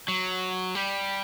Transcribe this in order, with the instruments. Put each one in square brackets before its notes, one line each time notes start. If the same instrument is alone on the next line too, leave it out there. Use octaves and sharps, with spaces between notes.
[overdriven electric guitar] F#3
G3